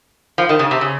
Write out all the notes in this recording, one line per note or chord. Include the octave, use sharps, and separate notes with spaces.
F3
D#3
C#3
C3
C#3